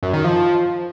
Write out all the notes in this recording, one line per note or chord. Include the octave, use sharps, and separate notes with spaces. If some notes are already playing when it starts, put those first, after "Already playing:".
F#2
D#3
F3